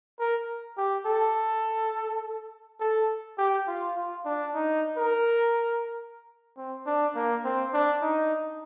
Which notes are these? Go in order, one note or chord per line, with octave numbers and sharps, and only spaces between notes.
A#4
G4
A4
A4
G4
F4
F4
D4
D#4
A#4
C4
D4
A#3
C4
D4
D#4